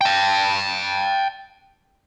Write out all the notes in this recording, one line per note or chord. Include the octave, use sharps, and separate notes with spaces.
G5 A5